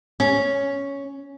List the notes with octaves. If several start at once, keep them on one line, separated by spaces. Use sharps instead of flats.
C#4